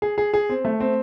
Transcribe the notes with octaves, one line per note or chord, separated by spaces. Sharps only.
G#4
G#4
G#4
C4
A3
C4